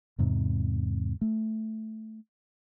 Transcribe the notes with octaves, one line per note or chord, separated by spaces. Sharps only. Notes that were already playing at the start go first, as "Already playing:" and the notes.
E2 G#2 C3
A3